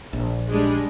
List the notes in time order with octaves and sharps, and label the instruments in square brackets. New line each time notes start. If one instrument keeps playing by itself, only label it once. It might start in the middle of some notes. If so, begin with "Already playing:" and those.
[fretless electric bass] A#1
[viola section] G3 G#3 D4